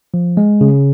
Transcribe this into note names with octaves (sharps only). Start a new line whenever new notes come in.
F3
G#3
C#3